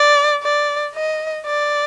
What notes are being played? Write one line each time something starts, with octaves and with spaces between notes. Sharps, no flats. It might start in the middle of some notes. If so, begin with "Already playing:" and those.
Already playing: D5
D5
D#5
D5